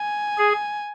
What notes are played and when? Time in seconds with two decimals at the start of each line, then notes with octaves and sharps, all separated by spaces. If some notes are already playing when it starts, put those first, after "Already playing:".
Already playing: G#5
0.38 G#4